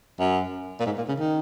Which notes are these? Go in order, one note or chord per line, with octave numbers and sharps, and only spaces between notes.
F#2
A#2
G#2
A#2
C#3
D#3